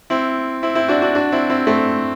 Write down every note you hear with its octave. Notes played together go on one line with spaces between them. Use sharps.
C4 E4
C4 E4
C4 E4
D4 F#4
D4 F#4
D4 F#4
C4 E4
C4 E4
A3 C4